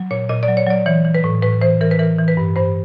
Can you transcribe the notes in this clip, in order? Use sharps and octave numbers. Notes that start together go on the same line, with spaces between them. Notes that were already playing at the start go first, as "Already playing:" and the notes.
Already playing: F#3
A#2 C#5
A#2 D#5
D5
F#3
C#5
F#3 D5
E3 C#5
E3
B4
A2
A2 B4
E3 C5
E3 A#4
B4
E3 A#4
E3
B4
G2
G2 C5